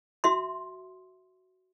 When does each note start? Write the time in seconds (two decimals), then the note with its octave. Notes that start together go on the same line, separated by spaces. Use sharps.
0.24 F#4 E5 C6